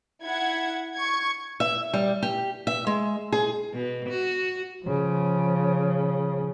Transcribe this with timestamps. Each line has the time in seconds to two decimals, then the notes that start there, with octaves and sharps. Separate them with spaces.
0.22 E4 F#5 G#6
0.95 C#6 G#6
1.60 E5
1.94 G3
2.22 G4
2.67 E5
2.87 G#3
3.32 G#4
3.74 B2
4.10 F#4
4.84 C#3 F3